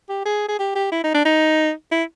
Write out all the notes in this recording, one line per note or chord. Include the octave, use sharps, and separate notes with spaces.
G4
G#4
G#4
G4
G4
E4
D#4
D4
D#4
E4